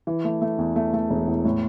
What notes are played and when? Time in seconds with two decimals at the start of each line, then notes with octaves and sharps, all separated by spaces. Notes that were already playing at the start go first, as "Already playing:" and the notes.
0.07 E3
0.25 A3
0.42 A3
0.58 E2
0.76 A3
0.94 A3
1.10 E1
1.28 E2
1.45 A2